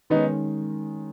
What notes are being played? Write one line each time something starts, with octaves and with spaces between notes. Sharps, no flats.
D#3 G#3 B3 C#4 D#4